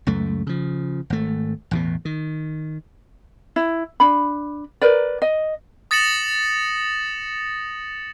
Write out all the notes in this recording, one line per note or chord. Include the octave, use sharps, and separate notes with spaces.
C#2 F#2 A3
C#3 F3
G#1 A3
A1 E2 B2
D#3
E4
D4 B5
A#4 B4 D5
D#5
D#6 A6 A#6 C#7 E7 F#7